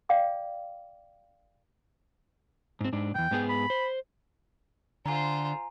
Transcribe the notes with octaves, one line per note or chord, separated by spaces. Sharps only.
D5 F5 G5 D6
G#2 C4
G#2 D4
E2 G2 G5
G#2 B3 G#4
B5
C5
D3 F4 C5 G#5 A#5